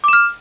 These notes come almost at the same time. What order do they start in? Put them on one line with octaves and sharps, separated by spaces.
D6 E7 F6